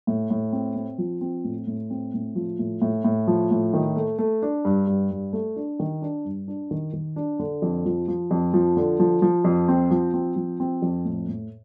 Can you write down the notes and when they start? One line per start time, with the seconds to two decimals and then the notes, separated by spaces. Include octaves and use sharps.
0.07 A2
0.30 A2
0.53 C4
0.76 C4
0.98 F3
1.21 C4
1.44 A2
1.67 A2
1.90 C4
2.14 A2
2.35 F3
2.59 A2
2.82 A2
3.04 A2
3.27 F3
3.51 A2
3.74 D#3
3.96 A3
4.19 A3
4.42 D4
4.65 G2
4.87 G2
5.11 G2
5.33 A3
5.56 D4
5.80 D#3
6.02 D4
6.25 G2
6.48 D4
6.71 D#3
6.93 D#3
7.16 D4
7.39 D3
7.62 F2
7.86 F3
8.08 F3
8.31 F2
8.54 F3
8.77 D3
9.00 F3
9.22 F3
9.45 F2
9.68 C4
9.91 F3
10.14 C4
10.36 F3
10.60 C4
10.82 F2
11.05 A2
11.28 A2